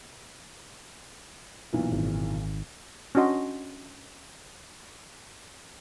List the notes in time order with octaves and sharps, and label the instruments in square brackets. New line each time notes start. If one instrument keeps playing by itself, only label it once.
[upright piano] B1 A#2 E3
[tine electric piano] G#1
[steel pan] C#4 D4 F#4 D#5 C6